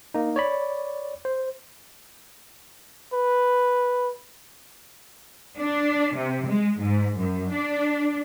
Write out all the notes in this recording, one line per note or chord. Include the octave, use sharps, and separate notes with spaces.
A#3 D#4
C#5 D5 B5
C5
B4
D4
C3
G#3
G#2
F#2
D4